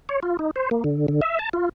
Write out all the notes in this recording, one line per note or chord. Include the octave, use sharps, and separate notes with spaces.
C#5
F4
D#4
C5
A#3
D3
D3
E5
A5
F4